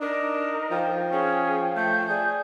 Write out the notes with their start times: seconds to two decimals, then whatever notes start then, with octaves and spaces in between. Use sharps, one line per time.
0.01 D4 D#4 A#4
0.71 F3 G5
1.12 C#4 G#4
1.76 A3 G6
2.09 G#4 D5